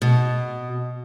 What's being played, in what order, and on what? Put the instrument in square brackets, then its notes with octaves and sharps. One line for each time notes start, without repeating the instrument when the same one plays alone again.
[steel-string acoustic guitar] B2